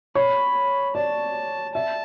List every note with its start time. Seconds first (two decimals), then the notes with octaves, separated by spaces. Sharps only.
0.15 C#5 B5
0.95 D5 A5
1.74 E5 A5